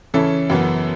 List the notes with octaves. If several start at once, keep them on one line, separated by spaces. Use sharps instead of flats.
C#3 E3 C#4 E4 A4
F#2 C#3 E3 B3